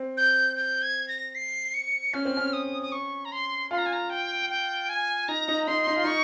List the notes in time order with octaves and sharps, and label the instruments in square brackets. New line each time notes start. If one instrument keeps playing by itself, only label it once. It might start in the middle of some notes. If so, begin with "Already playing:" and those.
Already playing: [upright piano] C4
[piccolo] G6
G6
G#6
A#6
C7
C#7
[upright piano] C#4 [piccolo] F6
[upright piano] C4
C#4
[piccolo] D#6
D#6
C#6
A#5
C6
[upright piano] F4 [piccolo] C6
[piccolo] A#5
G#5
A#5
G5
G5
G#5
[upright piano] D#4 [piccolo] A#5
[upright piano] D#4
[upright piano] D#4 [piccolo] C6
[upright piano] D#4
F4
[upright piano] D#4 [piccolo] C#6